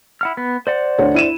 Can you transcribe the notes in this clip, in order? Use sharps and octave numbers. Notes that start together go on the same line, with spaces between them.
E4 F#5 F6
B3
C5 D5 F#5
D2 C#5
E4 D#7 E7